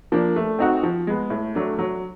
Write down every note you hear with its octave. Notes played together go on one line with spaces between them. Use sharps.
F3 A#3 D4
A3
C4 D#4 F#4
F3
G#3 B3
A2
F#3 A3 D4
F#3